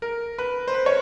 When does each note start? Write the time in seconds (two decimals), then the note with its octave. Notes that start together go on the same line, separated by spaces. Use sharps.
0.02 A#4
0.38 B4
0.67 C5
0.74 B4
0.86 C#5